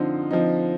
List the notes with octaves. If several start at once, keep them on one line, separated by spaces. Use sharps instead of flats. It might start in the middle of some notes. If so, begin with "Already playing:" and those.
Already playing: D3 F3 C4 D#4
F3 C4 D#4